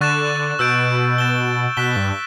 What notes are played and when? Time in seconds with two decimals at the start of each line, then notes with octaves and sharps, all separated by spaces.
0.01 D3 C#6 F#6 A6 E7
0.59 B2 E6 G6 D7
1.18 A6 E7 G7
1.77 B2 F#6 B6 E7 G7
1.96 G2